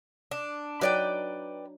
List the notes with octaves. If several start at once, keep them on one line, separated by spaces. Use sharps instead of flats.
D4
F#3 D4 D#4 B4 D5 G5